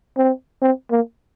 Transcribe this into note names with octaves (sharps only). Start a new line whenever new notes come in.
C4
C4
A#3